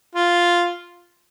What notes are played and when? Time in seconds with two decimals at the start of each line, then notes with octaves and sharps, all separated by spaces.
0.15 F4